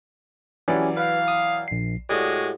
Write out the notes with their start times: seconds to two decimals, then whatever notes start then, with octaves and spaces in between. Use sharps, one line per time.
0.68 E3 F#3 C#4 E4 G4 D5
0.97 B4 F5
1.28 D#6
1.68 A#1 C7
2.09 A2 G#3 F#4 G4 D5 D#6